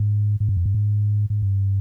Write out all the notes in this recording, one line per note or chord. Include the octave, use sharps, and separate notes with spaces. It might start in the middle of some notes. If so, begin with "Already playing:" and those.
Already playing: G#2
G#2
G2
F2
G2
G#2
G#2
G2